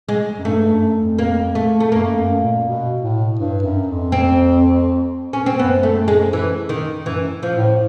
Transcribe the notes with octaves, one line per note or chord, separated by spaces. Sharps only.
G#3
F#2
G2 A3
F#2
F2
A#3
A3
A3
F#2 A#3
F#2
A#2
B2
A2
G2
F#2
F2
C4
C#4
C4
F#2 B3
A3
G#3
E3
D#3
F#2 E3
F3
A2